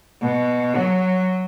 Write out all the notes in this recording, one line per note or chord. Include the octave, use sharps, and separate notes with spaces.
B2
F#3